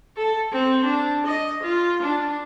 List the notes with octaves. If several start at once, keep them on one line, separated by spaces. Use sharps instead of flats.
A4
C4
D4
D#5
F4
D4